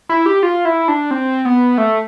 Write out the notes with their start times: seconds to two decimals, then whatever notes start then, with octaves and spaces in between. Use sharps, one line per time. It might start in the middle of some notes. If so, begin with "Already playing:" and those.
0.09 E4
0.26 G4
0.43 F4
0.65 E4
0.88 D4
1.11 C4
1.45 B3
1.78 A3